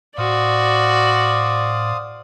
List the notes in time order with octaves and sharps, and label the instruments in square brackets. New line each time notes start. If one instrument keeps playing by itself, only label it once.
[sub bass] A2 [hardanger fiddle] F#4 [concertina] C5 F5 D#6 [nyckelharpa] D5